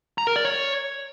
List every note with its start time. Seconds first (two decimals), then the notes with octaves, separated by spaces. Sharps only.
0.18 A#5
0.27 A#4
0.36 D5
0.45 C#5